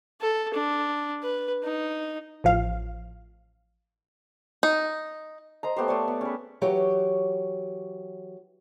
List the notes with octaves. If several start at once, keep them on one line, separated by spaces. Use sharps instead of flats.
A4
D4
B4
D#4
A1 F3 F5
D#4
C5 D#5 A#5
A3 B3 G4 C5
A3 C#5 D5
B3
C#4 G#4 B4
E3 F#3 G4 C#5